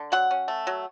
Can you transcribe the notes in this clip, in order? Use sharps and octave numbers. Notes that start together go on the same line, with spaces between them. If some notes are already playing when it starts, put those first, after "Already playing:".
Already playing: D3
F#3 F#5
C#4
A3
F#3